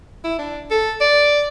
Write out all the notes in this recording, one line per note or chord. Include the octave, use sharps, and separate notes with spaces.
E4
D4
A4
D5